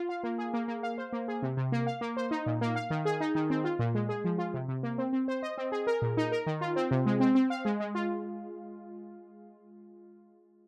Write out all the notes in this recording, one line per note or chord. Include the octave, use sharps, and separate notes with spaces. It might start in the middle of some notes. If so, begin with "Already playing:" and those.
Already playing: F4
F5
A#3
G#4
A#3
A#3
F5
C5
A#3
G#4
C3
C3
A#3
F5
A#3
C5
D#4
A#2
A#3
F5
D#3
G#4
D#4
D#3
C4
F4
A#2
G#3
G#4
F3
F4
C3
C3
A#3
C4
C4
C5
D#5
C4
G#4
A#4
A#2
D#4
A#4
D#3
F4
C4
C3
G#3
C4
C4
F5
G#3
G#3
F4